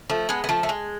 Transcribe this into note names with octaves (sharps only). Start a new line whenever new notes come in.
F3 A3
G#3 B3
B3
F3 A3
A3
G#3